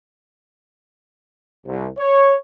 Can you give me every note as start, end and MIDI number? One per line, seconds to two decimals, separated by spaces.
1.66 1.87 36
1.99 2.34 73